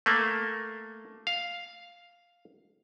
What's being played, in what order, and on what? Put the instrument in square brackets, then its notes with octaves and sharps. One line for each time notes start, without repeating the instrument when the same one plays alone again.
[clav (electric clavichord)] A3 A#3
F5